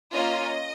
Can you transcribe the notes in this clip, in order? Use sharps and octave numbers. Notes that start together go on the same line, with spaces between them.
A#3 C#4 F4 D#5